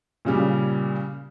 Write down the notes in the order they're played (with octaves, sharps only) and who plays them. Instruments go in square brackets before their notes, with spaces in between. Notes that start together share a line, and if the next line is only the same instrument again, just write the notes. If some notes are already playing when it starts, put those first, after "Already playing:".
[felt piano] A#2 C#3 G3